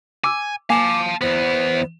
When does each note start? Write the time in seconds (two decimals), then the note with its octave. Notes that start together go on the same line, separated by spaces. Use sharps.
0.24 G#5 D6 E6
0.70 A#3 F5 G#5 A5 D6
1.21 E2 B3 C5